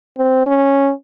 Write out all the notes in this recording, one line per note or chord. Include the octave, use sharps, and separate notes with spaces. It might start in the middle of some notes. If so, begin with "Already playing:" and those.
C4
C#4